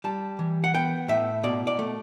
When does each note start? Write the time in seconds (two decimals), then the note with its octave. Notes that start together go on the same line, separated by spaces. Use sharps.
0.04 G3 A5
0.39 E3
0.64 F#5
0.74 B3 G5
1.08 A2 E5
1.43 B2 D5
1.67 D5
1.79 A3